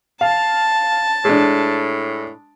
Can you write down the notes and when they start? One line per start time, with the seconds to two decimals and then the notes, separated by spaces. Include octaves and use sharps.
0.21 F5 A5
1.25 A2 G#3 D4